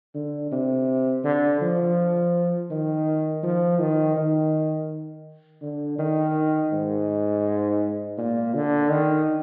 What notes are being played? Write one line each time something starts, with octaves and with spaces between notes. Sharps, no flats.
D3
C3
D3
F3
D#3
F3
D#3
D#3
D3
D#3
G#2
A#2
D3
D#3